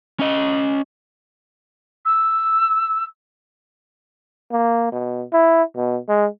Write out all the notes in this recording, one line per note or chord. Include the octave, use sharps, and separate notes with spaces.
C#4 D#5
E6
A#3
B2
E4
B2
G#3